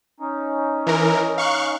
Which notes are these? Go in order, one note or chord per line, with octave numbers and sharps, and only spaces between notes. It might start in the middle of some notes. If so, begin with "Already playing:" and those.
C#4 D#4
E3 A#4
F5 C#6 F#6